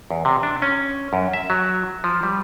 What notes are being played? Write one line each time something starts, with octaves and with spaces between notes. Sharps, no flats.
E2
C3
D4
C#4
F#2
E5
F#3
F3
G3